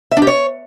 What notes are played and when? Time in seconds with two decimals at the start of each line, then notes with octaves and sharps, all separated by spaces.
0.11 E5
0.17 D4
0.22 G4
0.27 C#5